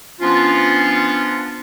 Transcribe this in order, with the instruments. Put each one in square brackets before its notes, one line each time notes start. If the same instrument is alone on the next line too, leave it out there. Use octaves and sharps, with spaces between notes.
[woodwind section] F3 B3 C#4 D4 F4